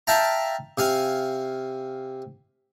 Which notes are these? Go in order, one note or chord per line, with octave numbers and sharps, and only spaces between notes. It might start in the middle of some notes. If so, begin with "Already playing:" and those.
E5 F5 G5 A5 A#5
C3 F5 G#5